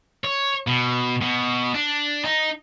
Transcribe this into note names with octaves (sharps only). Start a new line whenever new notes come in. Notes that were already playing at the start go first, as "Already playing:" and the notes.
C#5
B2
B2
D4
D#4